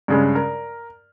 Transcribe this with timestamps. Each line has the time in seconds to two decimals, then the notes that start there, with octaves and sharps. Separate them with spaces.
0.08 G2 C#3 G#3
0.35 A#4